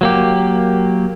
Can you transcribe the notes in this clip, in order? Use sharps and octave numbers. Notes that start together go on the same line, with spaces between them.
F#3 A#3 G4